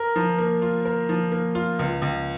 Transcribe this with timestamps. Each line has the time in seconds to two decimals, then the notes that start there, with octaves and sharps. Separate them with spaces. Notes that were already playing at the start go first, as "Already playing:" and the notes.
Already playing: A#4
0.16 F3
0.38 A#3
0.62 F4
0.85 A#4
1.09 F3
1.32 A#3
1.55 F4
1.79 C#2
2.02 C#2